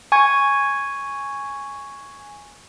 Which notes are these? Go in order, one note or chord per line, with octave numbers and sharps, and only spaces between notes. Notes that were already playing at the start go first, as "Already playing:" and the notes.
G#5 C#6 G#6